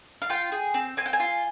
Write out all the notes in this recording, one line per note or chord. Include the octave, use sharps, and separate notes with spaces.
F5
F4 G5
G#4
C4
C4 G#5
G5
G#5
F4